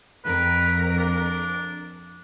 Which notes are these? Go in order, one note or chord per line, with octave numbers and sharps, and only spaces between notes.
F2 A#4 B4
D4